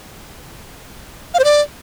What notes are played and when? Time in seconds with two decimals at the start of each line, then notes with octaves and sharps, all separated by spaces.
1.34 F5
1.39 C5
1.44 D5